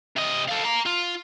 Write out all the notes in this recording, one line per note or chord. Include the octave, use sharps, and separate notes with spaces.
C3 D#5
A4 F5
F5 A#5
F4